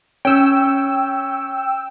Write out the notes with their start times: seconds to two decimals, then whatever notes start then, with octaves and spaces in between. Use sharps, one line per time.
0.25 C#4 G5 E6